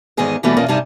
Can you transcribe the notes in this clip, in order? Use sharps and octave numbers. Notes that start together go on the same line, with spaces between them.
E2 G#2 D#3 B3 G#4 D#5
B2 E3 G3 A3 B3 F#4
E2 B2 C#4 F4 A#4 D#5
G2 C3 G3 D#4 G#5 A5